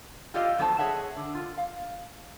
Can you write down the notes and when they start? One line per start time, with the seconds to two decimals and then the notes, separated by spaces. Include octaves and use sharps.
0.34 F4 G4 A4 D5 D#5 F5
0.58 F2 F#3 B3 A4 C5 A5
0.79 G#4 C#5 D#5 E5 F#5
1.16 D3
1.35 F4
1.58 F5